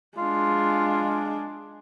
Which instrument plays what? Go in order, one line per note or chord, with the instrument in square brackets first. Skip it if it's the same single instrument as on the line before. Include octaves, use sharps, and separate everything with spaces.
[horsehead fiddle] G#3 D4 [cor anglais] F4